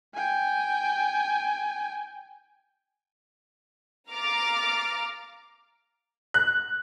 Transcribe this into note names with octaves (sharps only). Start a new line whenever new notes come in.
G5 G#5
F5 A#5 D6 F6 A6
F#6